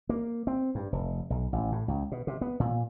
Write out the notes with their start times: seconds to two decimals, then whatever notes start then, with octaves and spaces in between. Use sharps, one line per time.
0.09 A#3
0.47 C4
0.75 G2
0.92 F1
1.30 B1
1.53 A1
1.72 A2
1.88 C#2
2.12 B2
2.27 C3
2.41 B3
2.60 A#2